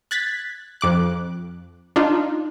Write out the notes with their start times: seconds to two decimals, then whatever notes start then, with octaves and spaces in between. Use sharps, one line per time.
0.11 F#6 G#6 A6 B6
0.81 F2 D6 F#6
1.96 D4 D#4 F4